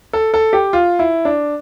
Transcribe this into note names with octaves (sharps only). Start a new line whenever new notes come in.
A4
A4
G4
F4
E4
D4